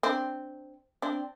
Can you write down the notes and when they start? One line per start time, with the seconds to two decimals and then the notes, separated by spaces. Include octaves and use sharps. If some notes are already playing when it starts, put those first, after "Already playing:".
0.03 C4 D4
1.02 C4 D4